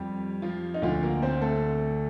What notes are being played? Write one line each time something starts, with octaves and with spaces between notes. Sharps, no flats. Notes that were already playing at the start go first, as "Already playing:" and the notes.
Already playing: F2 G3 G4
F3 F4
D#4
D2 D3 F3 F4
A#3 A#4
C4 C5
A3 A4